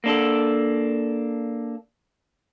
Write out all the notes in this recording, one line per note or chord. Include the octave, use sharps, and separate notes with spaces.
A#3 D4 A4